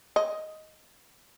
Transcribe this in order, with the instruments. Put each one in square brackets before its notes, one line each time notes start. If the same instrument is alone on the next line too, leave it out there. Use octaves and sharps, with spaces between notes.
[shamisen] D#5